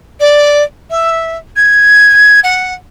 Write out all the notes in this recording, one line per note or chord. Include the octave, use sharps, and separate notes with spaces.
D5
E5
G#6
F#5